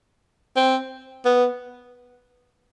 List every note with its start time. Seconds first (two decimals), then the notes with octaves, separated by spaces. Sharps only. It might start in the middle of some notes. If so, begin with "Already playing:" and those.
0.56 C4
1.25 B3